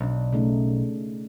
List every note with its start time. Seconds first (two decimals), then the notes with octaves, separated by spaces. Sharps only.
0.01 B1 B2 D4
0.33 C#3 A3 D#4